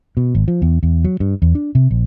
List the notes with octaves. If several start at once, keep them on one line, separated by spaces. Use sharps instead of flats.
B2
G#1
F3
E2
E2
F#3
G2
E2
D4
C3
A#1